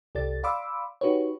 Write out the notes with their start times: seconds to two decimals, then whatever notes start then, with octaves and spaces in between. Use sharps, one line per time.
0.15 C2 G4 A4 D5 A6
0.43 D5 F5 B5 C6 D6 E6
1.01 D#4 F#4 G4 B4 C#5